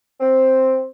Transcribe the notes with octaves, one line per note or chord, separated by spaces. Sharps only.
C4